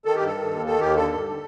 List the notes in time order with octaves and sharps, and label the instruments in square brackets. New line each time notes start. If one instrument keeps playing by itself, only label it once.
[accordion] D#3 A4
G4
G2
A4
D#3
D#2
D#3 A4
D#2 G4
D3 A4
G2
D3